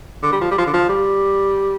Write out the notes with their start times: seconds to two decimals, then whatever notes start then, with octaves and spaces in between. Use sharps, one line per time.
0.23 D3
0.32 G3
0.41 F3
0.51 G3
0.58 F3
0.67 D3
0.73 F3
0.89 G3